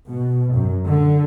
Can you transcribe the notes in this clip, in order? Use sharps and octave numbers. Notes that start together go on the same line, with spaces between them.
B2
F#2
D3